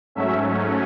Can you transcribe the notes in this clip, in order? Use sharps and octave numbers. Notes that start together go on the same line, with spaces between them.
G#2 F#3 A3 C#4 E5